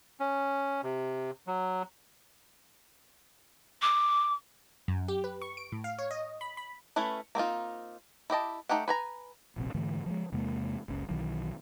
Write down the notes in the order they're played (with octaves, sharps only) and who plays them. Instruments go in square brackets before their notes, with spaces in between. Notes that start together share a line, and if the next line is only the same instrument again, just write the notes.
[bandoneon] C#4
C3
F#3
[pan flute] D6
[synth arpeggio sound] F#2
G4
B4
C#6
D7
A2
F5
C#5
D#5
B5
B5
[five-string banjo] A3 C#4 E4 B4
A#3 C4 D#4 F4
E4 G4 D#5 A5
A3 D#4 G4 F#5
B4 G#5 A#5
[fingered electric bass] D#1 A#1 C3
G#2 D3 E3 A3
F3 G3 G#3
E2 C3 G#3 A#3
F#1 C#2 C#3
B1 D#3 E3 F#3